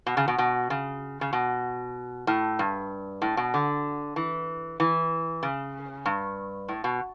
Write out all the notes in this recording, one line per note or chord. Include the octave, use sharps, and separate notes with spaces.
B2
C#3
B2
B2
C#3
C#3
B2
A2
G2
A2
B2
D3
E3
E3
C#3
G2
A2
B2